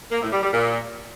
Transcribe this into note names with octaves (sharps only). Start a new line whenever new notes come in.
A#3
A2
G3
G3
A#2